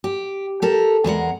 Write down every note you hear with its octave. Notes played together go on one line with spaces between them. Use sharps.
G4
G4 A4 A#4
E2 G#3 A#4 F#5